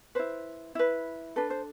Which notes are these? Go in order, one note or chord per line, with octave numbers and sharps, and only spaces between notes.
E4 B4 C5
E4 B4
D4 A4 B4
C5